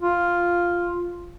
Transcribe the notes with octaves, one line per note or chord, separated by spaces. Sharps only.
F4